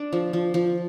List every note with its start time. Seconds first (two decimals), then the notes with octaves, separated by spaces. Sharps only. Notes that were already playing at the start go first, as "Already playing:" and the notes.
Already playing: D4 D5
0.12 F3
0.33 F3
0.54 F3